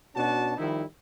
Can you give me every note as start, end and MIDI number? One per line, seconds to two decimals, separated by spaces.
0.16 0.55 47
0.16 0.55 61
0.16 0.55 62
0.16 0.55 66
0.16 0.55 81
0.58 0.83 51
0.58 0.83 53
0.58 0.83 55
0.58 0.83 63
0.58 0.83 64